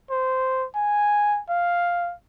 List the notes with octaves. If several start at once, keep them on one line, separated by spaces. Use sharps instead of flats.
C5
G#5
F5